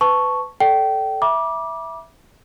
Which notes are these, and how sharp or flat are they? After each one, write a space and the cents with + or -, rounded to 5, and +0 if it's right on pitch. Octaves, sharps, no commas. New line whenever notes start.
B4 +25 A5 +0 C#6 +0
A4 +0 D5 +0 G5 -25
E5 +0 B5 -40 D6 +0